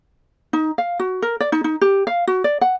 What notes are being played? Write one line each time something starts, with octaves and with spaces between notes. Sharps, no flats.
D#4
F5
F#4
A#4
D5
D#4
D#4
G4
F5
F#4
D5
F#5